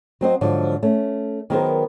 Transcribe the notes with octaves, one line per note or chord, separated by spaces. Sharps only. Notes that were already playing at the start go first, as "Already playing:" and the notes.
F#3 C4 C5 D#5
G#2 D3 F3 F#3
A3 C#4
D#3 F#3 B3 G#4 A#4 C5